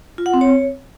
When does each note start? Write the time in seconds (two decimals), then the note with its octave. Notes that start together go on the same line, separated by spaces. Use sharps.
0.18 F4
0.26 F#5
0.34 C4
0.41 C#5